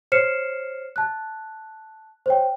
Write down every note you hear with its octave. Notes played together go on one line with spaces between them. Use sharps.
C5 C#5 F6 C7 C#7 E7
A5 F#6
C5 C#5 G5